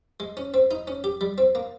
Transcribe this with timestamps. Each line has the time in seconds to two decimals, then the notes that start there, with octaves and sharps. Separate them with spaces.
0.20 G#3
0.37 C#4
0.54 C4
0.71 D#4
0.87 C#4
1.04 G4
1.21 G3
1.38 C4
1.55 A#3